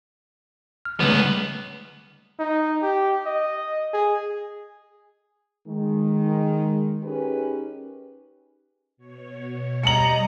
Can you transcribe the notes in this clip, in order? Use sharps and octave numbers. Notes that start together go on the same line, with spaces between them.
F6
C#2 D3 G3 A3 B3
D#4
G4
D#5
G#4
D#3 G#3
C#4 D#4 G4 G#4 A#4 B4
B2 C#5
G3 D#5 A#5 C#7 F#7